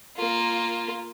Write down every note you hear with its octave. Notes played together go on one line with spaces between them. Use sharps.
A#3 F4